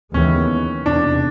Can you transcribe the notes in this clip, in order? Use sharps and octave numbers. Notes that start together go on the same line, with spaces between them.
D#2 C#3 E3 G#3 B3 C#4
E2 C3 D#3 D4